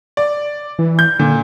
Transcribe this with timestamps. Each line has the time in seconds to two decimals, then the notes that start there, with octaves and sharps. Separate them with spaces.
0.17 D5
0.79 E3
0.99 G6
1.19 A#2 D3